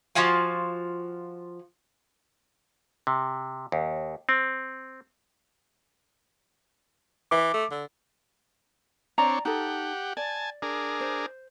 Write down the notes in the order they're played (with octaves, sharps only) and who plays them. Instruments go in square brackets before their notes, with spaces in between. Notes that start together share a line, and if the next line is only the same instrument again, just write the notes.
[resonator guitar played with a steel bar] F3 F4 F#4 F5 G#5
[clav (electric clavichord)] C3
D#2
C4
[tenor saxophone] E3 [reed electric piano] D6
[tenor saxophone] A3
D3
[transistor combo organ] C4 D4 C#5 [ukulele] D5 A#5
[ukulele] D#4 A4 [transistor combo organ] G4 F#5
[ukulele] D5 [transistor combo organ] G#5 A5
[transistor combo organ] D4 G#4 A#4
[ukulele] C5